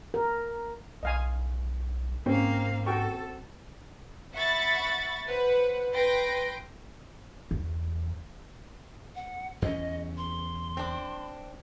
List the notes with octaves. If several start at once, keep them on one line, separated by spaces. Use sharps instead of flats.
A#4
B1 D#5 F5 G#5
G#2 A#3 C4 C#4 F5
F#4 A4 G5 C#6
E5 F#5 B5 C#6 A6
B4 C5 F#5
B4 G5 C6 A#6 D7
E2
F#5
E2 C#4 D#5
C6
C4 D4